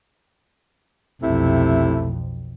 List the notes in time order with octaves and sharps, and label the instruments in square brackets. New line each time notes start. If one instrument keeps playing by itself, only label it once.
[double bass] B1 F2 [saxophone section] C3 A3 E4